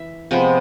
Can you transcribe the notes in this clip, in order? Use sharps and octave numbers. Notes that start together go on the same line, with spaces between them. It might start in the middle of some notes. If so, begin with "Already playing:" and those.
Already playing: E3 E5
C3 F3 G#3 B3